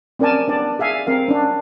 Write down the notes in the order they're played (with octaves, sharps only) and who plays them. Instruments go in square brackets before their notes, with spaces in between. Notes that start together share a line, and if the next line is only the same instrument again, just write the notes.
[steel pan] C4 C#4 A#4 D5 G#5 A5
B3 D4 D5
G#4 E5 F5 G#5
C4 A#4 F5
C#4 D4